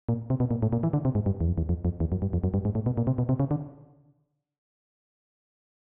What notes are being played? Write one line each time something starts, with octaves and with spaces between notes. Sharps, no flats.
A#2
C3
B2
A#2
A2
A#2
E3
D3
C3
G#2
G2
E2
F2
E2
F2
F2
E2
F#2
G2
F2
F#2
G2
G#2
A2
B2
A#2
C3
B2
C3
C#3
D3